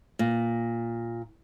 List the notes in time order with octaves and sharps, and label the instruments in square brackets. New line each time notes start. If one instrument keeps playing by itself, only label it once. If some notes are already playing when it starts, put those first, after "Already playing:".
[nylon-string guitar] A#2